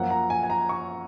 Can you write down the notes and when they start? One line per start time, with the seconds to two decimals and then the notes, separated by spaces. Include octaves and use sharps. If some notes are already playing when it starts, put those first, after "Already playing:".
Already playing: F#2 F3 A#3 F#5
0.10 A#5
0.30 G#5
0.43 G#5
0.50 A#5
0.69 C#6